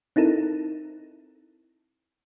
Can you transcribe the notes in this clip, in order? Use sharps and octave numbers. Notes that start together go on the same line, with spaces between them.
C4 D#4 E4 A4 A#4